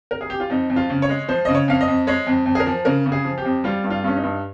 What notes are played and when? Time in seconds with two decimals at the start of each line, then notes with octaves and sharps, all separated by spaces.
0.11 A#4
0.21 G#4
0.30 G4
0.40 F4
0.50 F2 D#4
0.70 F2
0.76 F4
0.90 C#3
1.02 C#5
1.09 G#3
1.28 F3 C5
1.45 C#3 D#5
1.55 C#5
1.68 F2 F5
1.81 D#5
1.88 F2
2.07 G#3 C#5
2.27 F2
2.46 F2
2.55 G#4
2.60 A#4
2.66 F3
2.85 C#3 A#4
3.06 C#3
3.12 G#4
3.25 F3
3.38 G4
3.45 F2
3.64 G3 F4
3.84 G2
3.90 F4
4.04 G2 C#4
4.17 D#4
4.24 G2